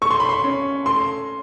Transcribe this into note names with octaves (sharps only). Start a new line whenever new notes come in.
A3 C#6
C6
B5
C6
C#4
A3 C6